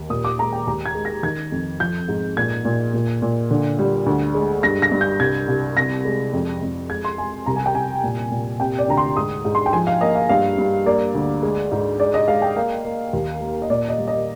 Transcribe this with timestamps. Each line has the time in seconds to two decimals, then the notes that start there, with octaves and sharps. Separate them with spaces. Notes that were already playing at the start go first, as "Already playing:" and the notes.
Already playing: D#2
0.10 A#2 D#6
0.24 D6
0.39 G#3 A#5
0.53 G5
0.67 D#2 A#5
0.86 G#6
0.95 G#3
1.05 A#6
1.23 D#3 G#6
1.52 F2
1.80 F3 G6
2.08 G#2
2.37 A#2 G#6
2.65 A#2
2.93 A#2
3.22 A#2
3.51 D3
3.79 G3
4.06 D2
4.34 G#3
4.63 G2 A#6
4.82 A#6
4.92 G2
5.01 G6
5.20 C2 G#6
5.48 C2
5.77 C3 A#6
6.05 G#3
6.33 F2
6.62 F2
6.90 G#3 G#6
7.04 C6
7.18 G#3 G#5
7.46 C2 A#5
7.56 G#5
7.66 G5
7.75 C2 G#5
8.03 A#2
8.31 A#2
8.60 C3 G5
8.79 D5
8.88 D2 A#5
8.97 C6
9.16 G#2 D#6
9.45 G#2
9.55 C6
9.66 G5
9.73 F3 G#5
9.87 F5
10.01 A#3 D#5
10.15 F5
10.29 G2 F5
10.58 G2
10.86 A#3 D5
11.15 D2
11.43 G#3
11.72 G#2
12.00 G#3 D5
12.14 D#5
12.28 G#3 F5
12.42 G5
12.56 A#3 F5
12.85 A#3
13.13 D#2
13.41 A#3
13.62 D#5
13.70 A#2 D5
13.89 D#5
13.98 G3
14.08 D#5